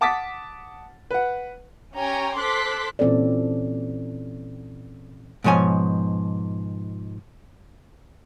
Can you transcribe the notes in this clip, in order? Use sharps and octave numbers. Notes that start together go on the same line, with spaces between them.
F#5 A5 D6 D#6 A6 B6
B4 F#5
C#4 G4 C#5 G5 G#5 A#5
A4 C5 C6 D6 F#6 B6
A#2 E3 C4 C#4 A4 D5
G#2 B2 F3 C#5 G#5